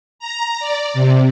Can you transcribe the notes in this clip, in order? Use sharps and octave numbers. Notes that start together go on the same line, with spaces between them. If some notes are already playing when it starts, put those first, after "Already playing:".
A#5
D5
C3